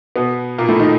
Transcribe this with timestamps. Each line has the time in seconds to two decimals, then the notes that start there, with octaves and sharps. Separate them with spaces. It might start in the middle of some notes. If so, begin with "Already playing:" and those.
0.16 B2 B3
0.58 A#2 A#3
0.68 A2 A3
0.80 D#3 D#4